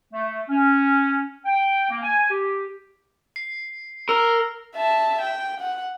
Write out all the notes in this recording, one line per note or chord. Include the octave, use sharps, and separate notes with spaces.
A3
C#4
G5
A#3
G#5
G4
C7
A#4 E6 F6
E5 A5
G5
F#5